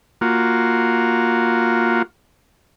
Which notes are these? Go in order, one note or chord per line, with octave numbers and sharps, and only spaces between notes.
A#3 F4 F#4